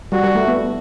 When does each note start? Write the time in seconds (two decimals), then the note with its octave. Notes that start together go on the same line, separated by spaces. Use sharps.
0.12 G3 F#4
0.24 G3
0.35 A3
0.48 B3